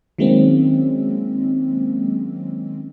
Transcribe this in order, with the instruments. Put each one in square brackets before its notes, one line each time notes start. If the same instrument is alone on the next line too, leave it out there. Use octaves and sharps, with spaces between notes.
[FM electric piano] D#3 F#3 G#3 A#3 C4 C#4